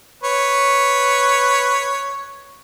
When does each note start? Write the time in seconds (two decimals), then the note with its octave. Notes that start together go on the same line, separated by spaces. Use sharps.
0.23 B4 C#5